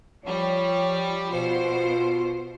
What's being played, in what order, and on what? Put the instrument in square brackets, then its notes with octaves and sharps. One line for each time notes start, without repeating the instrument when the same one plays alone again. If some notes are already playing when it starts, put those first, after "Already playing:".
[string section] F3 G3 [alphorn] C#5
[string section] B2 C5 [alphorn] F4